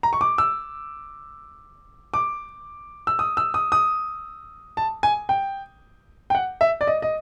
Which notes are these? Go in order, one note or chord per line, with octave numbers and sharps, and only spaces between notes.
A#5
C#6
D6
E6
D6
E6
D#6
E6
D#6
D#6
A5
G#5
G5
G5
F#5
E5
D5
D#5
D#5